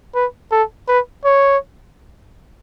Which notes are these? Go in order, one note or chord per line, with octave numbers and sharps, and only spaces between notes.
B4
A4
B4
C#5